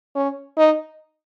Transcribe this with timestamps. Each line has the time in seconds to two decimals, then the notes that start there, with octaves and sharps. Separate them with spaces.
0.15 C#4
0.58 D#4